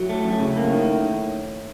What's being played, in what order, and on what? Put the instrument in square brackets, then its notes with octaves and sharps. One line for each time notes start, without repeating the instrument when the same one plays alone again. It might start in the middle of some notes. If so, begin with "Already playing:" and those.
Already playing: [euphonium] A2 [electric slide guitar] F#3
[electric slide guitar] A3
F#2
C#3
A#3
D#3